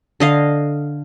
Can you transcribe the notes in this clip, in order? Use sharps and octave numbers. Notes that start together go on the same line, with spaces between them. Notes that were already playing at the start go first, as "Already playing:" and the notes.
D3 D#5 F5